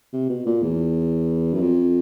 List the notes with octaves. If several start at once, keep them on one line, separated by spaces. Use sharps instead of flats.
C3
B2
A#2
E2
F#2
F2